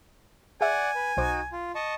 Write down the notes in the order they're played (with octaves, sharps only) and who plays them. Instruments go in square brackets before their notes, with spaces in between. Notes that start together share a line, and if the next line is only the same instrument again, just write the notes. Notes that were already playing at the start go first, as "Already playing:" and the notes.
[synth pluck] G#4 E5 [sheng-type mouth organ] D5 F#5 [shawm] G#5
[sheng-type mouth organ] B4
[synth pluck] B1 C5 D6 [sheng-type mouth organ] D#4 F#4
[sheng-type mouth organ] F4
D#5 A5 C#6